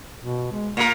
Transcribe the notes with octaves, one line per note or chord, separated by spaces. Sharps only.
B2
G#3
A#2 A#3 A#4